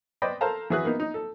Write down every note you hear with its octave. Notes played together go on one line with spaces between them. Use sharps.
B4 C5 D5 D#5 G5 B5
A4 A#4 C5 F5 A5 A#5
E3 F#4 G#4 B4 F#6
A#3 B3 D#4
D#4
A4